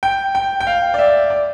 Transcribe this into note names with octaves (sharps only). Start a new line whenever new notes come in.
G5
G5
G5
F5
D5
E5
D5